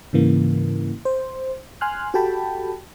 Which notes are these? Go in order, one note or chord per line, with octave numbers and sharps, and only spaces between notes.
G#2 C#3 E3 A#3
C5
G#5 C6 F6 F#6
F#4 G4 A4 G5 A5 B5